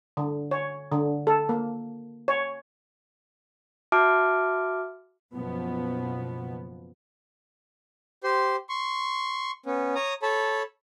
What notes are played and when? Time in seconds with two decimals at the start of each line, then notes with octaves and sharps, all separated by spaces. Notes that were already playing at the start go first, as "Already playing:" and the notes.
0.17 D3
0.51 C#5
0.92 D3
1.27 A4
1.49 A#3
2.28 C#5
3.92 F#4 E5 A5 D6 F6 D7
5.34 F#1 B2 F3 B3
8.24 G4 C5 C6
8.69 C6 C#6
9.66 B3 C#4
9.95 C#5 A#5 D#6
10.22 A4 C#5 A5 B5